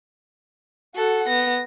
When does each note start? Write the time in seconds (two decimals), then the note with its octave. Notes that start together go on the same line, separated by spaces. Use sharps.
0.95 F#4 A4 F#5
1.28 B3 A#6